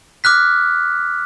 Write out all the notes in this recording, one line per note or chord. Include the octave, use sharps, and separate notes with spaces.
D6 F6 F#6 B6